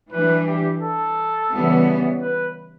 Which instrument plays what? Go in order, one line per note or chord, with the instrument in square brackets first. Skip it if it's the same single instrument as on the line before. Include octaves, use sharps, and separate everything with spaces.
[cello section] E3 G3 D4 [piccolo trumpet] B4
[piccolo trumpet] G4
A4
[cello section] C#3 E3 G3 B3
[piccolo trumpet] B4